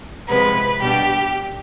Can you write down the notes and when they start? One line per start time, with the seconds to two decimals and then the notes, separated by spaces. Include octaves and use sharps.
0.27 C3 F3 G#3 B3 B4
0.81 B2 G3 D4 G4